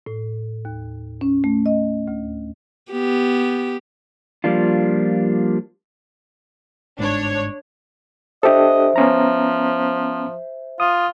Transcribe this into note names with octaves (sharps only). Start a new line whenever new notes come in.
A2
D#2
C#4
A3
D#5
D2
B3 G4
F3 G3 A#3 D4 F4
G1 G#2 D4 C#5
D4 G4 A4 C5 D#5 E5
F3 B3 C#4 A#5
F4 D#6